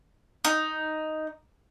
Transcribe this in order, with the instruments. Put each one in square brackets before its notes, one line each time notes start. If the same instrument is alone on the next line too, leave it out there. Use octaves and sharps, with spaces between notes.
[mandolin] D#4